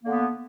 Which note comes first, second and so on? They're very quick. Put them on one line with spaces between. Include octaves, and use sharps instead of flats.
A#3 D3 B3